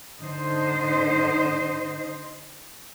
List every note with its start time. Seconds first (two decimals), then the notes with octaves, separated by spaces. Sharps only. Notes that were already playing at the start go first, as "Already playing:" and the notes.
0.21 D3 D#4 C5 D#5